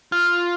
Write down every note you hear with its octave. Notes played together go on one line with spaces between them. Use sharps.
F4